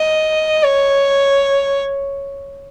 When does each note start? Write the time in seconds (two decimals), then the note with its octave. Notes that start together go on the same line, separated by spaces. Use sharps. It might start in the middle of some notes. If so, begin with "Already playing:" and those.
Already playing: D#5
0.63 C#5